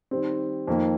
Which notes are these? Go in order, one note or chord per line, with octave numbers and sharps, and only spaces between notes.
D#3 G3 C4
F2 D#3 A#3